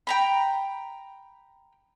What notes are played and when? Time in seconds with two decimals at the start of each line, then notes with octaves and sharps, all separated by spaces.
0.07 G5 A#5 B5